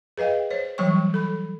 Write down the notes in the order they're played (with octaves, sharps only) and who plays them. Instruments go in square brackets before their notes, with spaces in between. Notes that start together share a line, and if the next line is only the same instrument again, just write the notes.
[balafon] G#4 B4 D#5 F5 G5
C5 C#5
E3 F#3 G3 C#5 G5 C#6
A4 B5